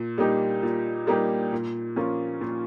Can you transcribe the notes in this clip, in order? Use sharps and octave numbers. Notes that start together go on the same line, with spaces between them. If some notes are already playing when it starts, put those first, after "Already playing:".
Already playing: A#2
G3 A#3 D#4 G4
A#2
G3 A#3 D#4 G4
A#2
F3 A#3 C#4 F4
A#2